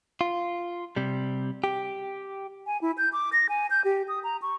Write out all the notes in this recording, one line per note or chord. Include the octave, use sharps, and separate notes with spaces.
F4
C3 G3
G4
G#5
E4
G6
D6
A#6
G#5
G6
G4
D#6
A#5
C#6